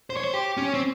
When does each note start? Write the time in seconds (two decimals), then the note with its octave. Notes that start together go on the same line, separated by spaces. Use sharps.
0.10 C5
0.17 C#5
0.24 C5
0.34 G4
0.57 C#4
0.74 C4